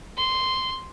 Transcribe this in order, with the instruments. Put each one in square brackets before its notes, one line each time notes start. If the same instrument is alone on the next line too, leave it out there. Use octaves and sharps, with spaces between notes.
[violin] C6